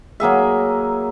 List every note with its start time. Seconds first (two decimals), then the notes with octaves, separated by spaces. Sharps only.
0.20 F#3 A#3 G#4 E5